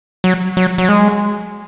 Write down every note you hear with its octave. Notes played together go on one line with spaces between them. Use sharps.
F#3
F#3
F#3
G#3